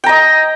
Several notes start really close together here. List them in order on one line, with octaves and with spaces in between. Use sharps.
G5 A#5 D#5